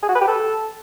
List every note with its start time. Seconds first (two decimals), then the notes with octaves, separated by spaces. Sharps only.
0.02 G#4
0.09 F#4
0.15 B4
0.21 G4
0.27 A4